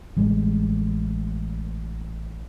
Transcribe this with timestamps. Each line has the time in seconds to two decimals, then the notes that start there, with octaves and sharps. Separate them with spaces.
0.17 A1 G3 G#3